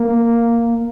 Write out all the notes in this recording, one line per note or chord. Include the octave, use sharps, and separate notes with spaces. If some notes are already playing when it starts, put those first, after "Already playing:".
Already playing: A#3